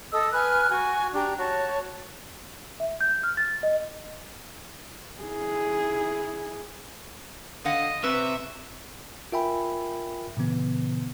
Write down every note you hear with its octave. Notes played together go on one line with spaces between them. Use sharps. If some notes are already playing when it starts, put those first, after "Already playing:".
A4 D#5 D#6 E6
B4 G#5 F6 F#6
F#4 G#5 C#6
D4 G4 A#5
F#4 C#5 A5
E5
G6
F6
A6
D#5
E4 G#4
D3 D#5 F5 F#5
C3 B4 E5 C#6
F4 A#4 E5 G5 G#5 B5
A#2 C#3 E3 B3